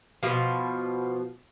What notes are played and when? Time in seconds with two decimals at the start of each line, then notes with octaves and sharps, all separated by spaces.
0.23 B2 F3